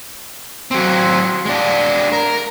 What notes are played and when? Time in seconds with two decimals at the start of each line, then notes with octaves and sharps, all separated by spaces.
0.71 F#3 C4
1.45 G#3 D4
2.12 A#4